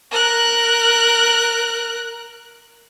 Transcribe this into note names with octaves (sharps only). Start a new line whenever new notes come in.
A#4 F#6